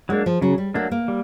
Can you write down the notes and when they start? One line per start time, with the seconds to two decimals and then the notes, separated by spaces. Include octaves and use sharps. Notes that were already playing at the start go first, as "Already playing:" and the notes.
0.09 F#3 G#3 A#3 D4
0.26 F3
0.41 C#3 F#3
0.58 G3
0.74 F#3 A3 A#3 D4
0.91 A#3
1.08 G3